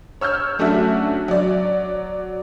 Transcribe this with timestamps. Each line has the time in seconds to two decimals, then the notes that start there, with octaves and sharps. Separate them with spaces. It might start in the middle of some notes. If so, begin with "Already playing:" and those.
0.21 C#5 E6 F6 G6
0.59 F#3 A3 C#4 D4 F#4 E5
1.28 F#3 D5